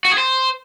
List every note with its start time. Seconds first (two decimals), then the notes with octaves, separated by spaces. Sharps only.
0.05 F#4
0.11 G#4
0.18 C5